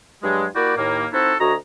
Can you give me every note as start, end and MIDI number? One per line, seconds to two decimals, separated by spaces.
0.23 0.46 43
0.23 0.46 54
0.23 0.46 56
0.56 0.75 58
0.56 0.75 64
0.56 0.75 66
0.56 0.75 67
0.56 0.75 74
0.77 1.07 39
0.77 1.07 45
0.77 1.07 58
1.13 1.34 60
1.13 1.34 63
1.13 1.34 64
1.13 1.34 66
1.13 1.34 69
1.40 1.54 38
1.40 1.54 66
1.40 1.54 73
1.40 1.54 75
1.40 1.54 82